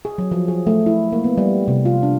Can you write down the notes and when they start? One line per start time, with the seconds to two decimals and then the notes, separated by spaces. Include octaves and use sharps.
0.05 G#4
0.18 F#3
0.31 F3
0.48 G#4
0.67 A3
0.86 E4
1.12 A#3
1.24 B3
1.38 G3
1.68 C3
1.85 F4
2.03 D4